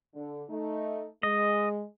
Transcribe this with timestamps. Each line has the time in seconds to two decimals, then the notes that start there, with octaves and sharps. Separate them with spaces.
0.14 D3
0.50 A3 D#4
1.23 G#3 D#5